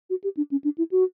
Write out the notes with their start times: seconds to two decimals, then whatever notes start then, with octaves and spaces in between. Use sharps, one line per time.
0.10 F#4
0.24 G4
0.37 D4
0.51 C#4
0.64 D4
0.78 E4
0.91 F#4